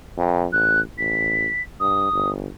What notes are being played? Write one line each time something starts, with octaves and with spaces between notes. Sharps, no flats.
F2
A1 F#6
A1 B6
G2 D#6
G1